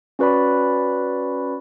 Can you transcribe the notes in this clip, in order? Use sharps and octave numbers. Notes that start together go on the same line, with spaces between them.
C#4 F#4 B4 D5 B5